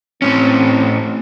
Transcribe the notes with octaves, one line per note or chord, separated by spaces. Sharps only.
A2 C4 C#4